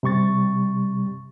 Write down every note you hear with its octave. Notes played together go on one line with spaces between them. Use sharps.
C3 G3 C#6 A6